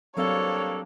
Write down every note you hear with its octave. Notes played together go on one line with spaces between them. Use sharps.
F#3 G3 A#3 C4 D4 A4 C#5 F5